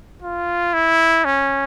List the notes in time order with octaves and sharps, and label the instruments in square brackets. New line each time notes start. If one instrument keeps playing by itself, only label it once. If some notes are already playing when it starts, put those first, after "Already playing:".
[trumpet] F4
E4
C#4